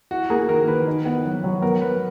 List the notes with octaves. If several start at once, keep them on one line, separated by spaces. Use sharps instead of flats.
E4 F#4
A#3 G#4
D#3 A#4
D#3 B4
D#4
B3
F#3
F#3
B3 A#4
F#3 B4